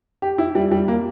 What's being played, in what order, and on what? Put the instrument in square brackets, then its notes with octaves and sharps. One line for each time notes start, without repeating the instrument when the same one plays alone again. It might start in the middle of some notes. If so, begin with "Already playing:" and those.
[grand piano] G4
E4
G3
G3
A#3